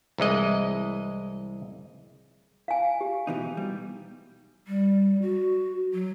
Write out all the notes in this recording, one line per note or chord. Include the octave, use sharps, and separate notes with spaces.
C2 E3 G#3 D#5
F5 G#5
G4
B2 E3 D#4
B2 G3
G3
F#4
F#3